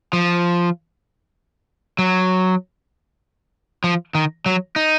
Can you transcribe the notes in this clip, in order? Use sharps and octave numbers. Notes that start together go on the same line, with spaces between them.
F3
F#3
F3
D#3
F#3
D#4